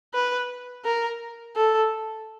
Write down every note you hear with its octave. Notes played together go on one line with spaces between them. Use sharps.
B4
A#4
A4